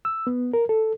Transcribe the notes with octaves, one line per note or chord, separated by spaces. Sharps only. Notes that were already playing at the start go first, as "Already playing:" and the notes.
E6
B3
A#4
A4